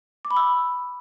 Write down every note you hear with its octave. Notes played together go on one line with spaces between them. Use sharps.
D6
B5
E6